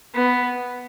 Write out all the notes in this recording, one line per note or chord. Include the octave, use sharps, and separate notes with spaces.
B3